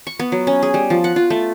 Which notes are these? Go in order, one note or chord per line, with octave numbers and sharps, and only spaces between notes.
C#6
B3
F#3
C#4
G#4
G3
F3
F#5
F4
A3